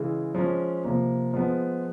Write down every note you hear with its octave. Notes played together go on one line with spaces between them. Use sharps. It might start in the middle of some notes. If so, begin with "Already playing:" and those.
Already playing: C#3 E3 G#3
F3 G#3 C#4
C3 F3 A#3
F3 G#3 B3